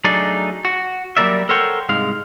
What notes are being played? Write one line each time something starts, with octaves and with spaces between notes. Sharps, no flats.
F#3 A3 D4 D#4 G#4 D5
F#4
F#3 G3 A#3 A#4 D5 E5
A4 A#4 C5 C#5 F#5 G5
C2 G#2 G#3 F5